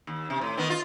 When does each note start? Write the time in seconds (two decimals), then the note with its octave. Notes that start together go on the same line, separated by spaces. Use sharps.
0.07 D#2
0.30 C3
0.41 A2
0.57 D#3 B3
0.70 F4